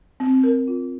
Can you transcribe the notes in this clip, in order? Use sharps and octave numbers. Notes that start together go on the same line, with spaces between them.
C4
A#4
F4